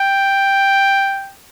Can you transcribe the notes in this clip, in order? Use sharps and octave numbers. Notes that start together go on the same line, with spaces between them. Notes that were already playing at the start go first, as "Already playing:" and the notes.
Already playing: G5